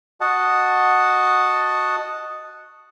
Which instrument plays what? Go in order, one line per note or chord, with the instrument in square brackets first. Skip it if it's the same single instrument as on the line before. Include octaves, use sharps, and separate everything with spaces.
[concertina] F#4 D#5 F#5 A5